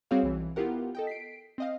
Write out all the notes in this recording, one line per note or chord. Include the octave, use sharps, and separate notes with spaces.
G3 C4 F#4 G#4 C#5 F5
B1 E3
B3 E4 F4 G4 A#4 F#5
A4 D#5 G5
B6 C7 D7
C4 D#5 F5